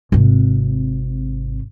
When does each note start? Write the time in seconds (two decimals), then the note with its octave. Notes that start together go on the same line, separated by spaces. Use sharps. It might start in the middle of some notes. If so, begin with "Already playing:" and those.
0.12 G#1 C3